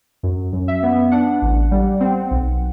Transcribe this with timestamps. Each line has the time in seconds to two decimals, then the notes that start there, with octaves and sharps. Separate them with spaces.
0.23 F#2
0.53 F#2
0.68 E5
0.83 B3
1.11 D4 F#5
1.42 A1
1.71 G3
2.00 C4
2.31 B1